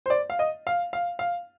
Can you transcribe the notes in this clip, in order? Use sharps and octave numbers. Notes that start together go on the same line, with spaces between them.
C5
D5
F5
D#5
F5
F5
F5